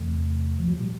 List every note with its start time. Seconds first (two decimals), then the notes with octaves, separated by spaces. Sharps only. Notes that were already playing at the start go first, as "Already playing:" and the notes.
Already playing: E2 C3 A3
0.59 F3
0.68 F#3
0.78 A#2 G3